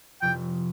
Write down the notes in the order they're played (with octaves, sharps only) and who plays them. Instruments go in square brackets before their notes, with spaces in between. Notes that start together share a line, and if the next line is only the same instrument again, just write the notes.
[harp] F1 F2 C3 F3 [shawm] G5